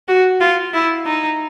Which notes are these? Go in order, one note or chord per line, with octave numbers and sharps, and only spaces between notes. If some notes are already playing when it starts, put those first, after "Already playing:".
F#4
F4
E4
D#4